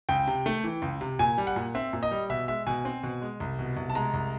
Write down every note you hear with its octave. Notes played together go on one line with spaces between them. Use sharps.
C#2 G5
C3
A3
E3
C#2
C3
A#2 G#5
G3
F#5
A#2
C4 E5
A#2
D#5
G3
B2 E5
G#3 E5
B2 G#5
C4
B2
G#3
C2
B2
C2
A5
G#3 A#5
C2